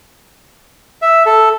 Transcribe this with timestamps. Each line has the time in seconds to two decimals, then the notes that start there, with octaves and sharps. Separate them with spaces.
1.02 E5
1.26 A4